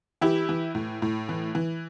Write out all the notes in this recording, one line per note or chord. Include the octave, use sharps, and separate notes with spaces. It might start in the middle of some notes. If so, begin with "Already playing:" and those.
E3 E4 G4
E3
A2
A2
E3
E3